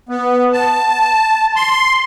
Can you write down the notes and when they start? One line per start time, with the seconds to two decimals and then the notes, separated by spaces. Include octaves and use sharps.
0.09 B3
0.53 A5
1.56 C6